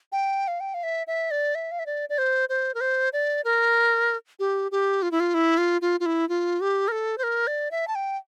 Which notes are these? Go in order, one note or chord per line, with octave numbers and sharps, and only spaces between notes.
G5
F5
G5
F5
E5
E5
D5
E5
F5
E5
D5
D5
C5
C5
A#4
C5
D5
A#4
G4
G4
F4
E4
F4
E4
F4
F4
F4
E4
F4
G4
A#4
A4
C5
A#4
D5
E5
A5
G5